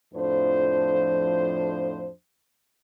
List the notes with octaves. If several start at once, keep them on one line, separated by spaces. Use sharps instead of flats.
F2 A2 F3 D4 C5